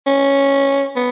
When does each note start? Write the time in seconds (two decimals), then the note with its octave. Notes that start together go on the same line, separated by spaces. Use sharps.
0.07 C#4
0.96 B3